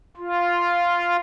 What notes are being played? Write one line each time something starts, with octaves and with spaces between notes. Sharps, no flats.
F4